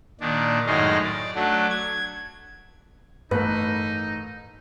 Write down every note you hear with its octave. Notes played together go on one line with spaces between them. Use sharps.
A#2 D#3 D4
F#2 A2 D#3 G#3 D#5 F5
D5
F#3 A3 D4
G#6
A1 G2 A3 D#4 A#4 B4